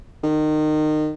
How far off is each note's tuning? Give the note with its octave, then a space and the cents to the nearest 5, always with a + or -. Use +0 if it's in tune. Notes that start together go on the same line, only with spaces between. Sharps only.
D#3 -25